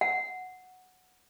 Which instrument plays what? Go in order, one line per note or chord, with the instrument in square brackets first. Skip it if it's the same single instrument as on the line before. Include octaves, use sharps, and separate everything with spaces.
[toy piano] F#5